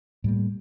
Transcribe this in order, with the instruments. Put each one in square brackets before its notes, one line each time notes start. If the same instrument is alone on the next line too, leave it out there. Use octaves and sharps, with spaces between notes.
[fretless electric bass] A2 G3 A#3